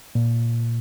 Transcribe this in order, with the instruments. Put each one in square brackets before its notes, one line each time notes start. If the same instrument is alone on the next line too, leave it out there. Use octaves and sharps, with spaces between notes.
[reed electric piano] A#2